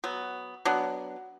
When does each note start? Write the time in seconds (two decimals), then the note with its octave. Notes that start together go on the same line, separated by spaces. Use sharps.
0.04 F#3 B3
0.65 F#3 B3 D4